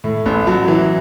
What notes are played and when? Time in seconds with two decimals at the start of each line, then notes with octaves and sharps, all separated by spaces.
0.04 A2
0.26 A1
0.47 F#3
0.68 E3